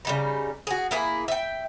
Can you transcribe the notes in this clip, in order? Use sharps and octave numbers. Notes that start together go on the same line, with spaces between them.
C#3 G3 D#4
F#4 G#4
A#3 E4 G#4
E5 G5